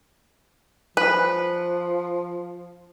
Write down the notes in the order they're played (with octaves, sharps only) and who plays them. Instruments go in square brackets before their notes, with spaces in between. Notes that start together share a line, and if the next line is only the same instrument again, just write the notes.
[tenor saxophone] F3 [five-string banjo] B4